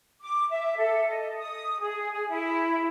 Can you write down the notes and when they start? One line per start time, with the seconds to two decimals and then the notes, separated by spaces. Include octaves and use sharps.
0.22 D6
0.50 E5
0.77 A4
1.08 D#5
1.37 D#6
1.81 G#4
2.11 G#4
2.29 E4